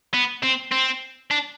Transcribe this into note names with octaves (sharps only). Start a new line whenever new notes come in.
B3
C4
C4
D4